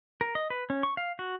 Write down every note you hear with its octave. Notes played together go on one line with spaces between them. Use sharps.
A#4
D#5
B4
C#4
C#6
F5
F#4